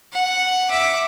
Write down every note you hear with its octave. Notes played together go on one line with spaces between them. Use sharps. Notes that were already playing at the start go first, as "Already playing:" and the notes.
F#5
E5 D6